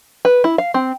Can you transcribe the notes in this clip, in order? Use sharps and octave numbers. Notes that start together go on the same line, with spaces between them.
B4
E4
F5
C4